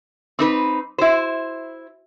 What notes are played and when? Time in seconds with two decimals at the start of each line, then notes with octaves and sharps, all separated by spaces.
0.39 C4 D#4 B4 D6
0.98 E4 F#4 C5 E5